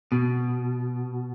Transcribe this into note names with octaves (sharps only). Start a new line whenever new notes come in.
B2